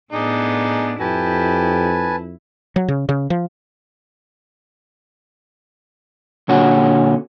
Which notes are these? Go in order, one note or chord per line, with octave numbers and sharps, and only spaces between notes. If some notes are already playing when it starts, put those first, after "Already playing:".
A2 B3 D4 D#4 G#4
F2 E4 G4 B4 G#5 A5
F#3
C#3
C#3
F3
A#2 D3 C#4 F#4